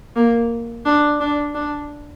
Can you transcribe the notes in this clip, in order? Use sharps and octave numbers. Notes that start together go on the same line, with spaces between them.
A#3
D4
D4
D4